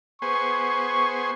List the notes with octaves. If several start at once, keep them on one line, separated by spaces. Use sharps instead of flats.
B3 G#4 C5 C#6